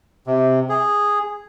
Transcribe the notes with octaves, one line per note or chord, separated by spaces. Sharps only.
C3
G#4